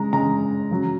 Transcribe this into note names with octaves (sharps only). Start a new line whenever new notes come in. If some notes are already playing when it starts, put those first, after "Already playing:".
Already playing: C#3 G#3 A#5
C#3 G#3 A#5
C#3 F#3